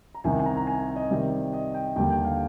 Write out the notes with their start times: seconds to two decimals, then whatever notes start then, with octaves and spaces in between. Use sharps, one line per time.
0.15 A#5
0.24 C2 C3 D#3 G#5
0.39 G#5
0.46 A#5
0.57 A#5
0.67 G#5
0.96 D#5
1.10 C3 D#3 G3 C4 D5
1.53 D#5
1.74 G5
1.96 D#2 D3 G3 G5
2.10 G5
2.25 F5